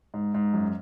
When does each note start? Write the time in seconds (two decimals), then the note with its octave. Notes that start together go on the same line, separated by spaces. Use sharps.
0.14 G#2
0.34 G#2
0.54 F#2